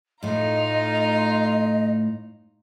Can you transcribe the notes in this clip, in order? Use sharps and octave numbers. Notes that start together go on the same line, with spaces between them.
A2 A3 D#4 F4 D#5 A#5